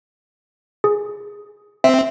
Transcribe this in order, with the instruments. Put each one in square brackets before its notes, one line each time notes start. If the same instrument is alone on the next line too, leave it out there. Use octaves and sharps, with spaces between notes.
[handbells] G#4
[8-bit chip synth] C4 [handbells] E5